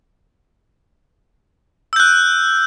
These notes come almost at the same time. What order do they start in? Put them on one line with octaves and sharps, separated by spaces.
E6 G6 F#6